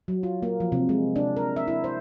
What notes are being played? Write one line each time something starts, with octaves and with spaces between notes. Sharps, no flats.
F#3
F4
A#3
F3
C3
G#3
D4
A#4
E5
E4
C5